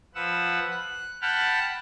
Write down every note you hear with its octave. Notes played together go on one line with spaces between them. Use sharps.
F3 B4 F#5 E6
F#6
F#5 G5 A5 B5 F6 F#6